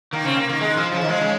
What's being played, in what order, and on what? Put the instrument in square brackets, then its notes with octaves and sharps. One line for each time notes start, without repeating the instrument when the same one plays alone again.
[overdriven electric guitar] D#3 [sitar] A#3
[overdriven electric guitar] C#3 [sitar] C4
[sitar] A#3
[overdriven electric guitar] D#3 [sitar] A#3
[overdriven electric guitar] D#3 [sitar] G#3
[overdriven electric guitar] F3
[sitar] C#3 [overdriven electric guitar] F3
[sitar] D#3
[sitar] F3 [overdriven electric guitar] G#3
[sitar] C#3